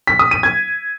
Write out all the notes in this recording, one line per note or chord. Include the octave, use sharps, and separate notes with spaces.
B6
D#6
D#7
G#6